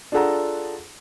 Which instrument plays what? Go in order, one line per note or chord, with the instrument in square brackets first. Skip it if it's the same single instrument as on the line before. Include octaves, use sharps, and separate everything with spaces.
[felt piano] D4 F4 G#4 A4 F#5 A#5